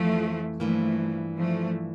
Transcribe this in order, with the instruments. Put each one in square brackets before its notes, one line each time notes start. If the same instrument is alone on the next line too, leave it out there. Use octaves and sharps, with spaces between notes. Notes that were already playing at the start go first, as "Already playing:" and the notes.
Already playing: [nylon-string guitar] F2 E3 [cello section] F3 A3
[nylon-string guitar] G2 E3 A#3 [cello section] F3 A3
[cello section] F3 A3